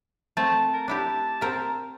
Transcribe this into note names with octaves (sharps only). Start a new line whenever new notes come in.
A3 C4 A5
A#4
D4 E4 G4 A5
C4 A#4 E5